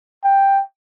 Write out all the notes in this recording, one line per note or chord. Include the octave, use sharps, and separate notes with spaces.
G5